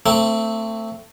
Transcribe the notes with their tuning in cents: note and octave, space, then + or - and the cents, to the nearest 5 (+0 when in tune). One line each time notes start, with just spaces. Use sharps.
A3 +25 C4 +0